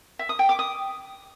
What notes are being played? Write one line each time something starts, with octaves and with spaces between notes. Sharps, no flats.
E5
D#6
G5
D6
D#6